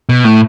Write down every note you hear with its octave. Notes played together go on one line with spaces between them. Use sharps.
B2
A2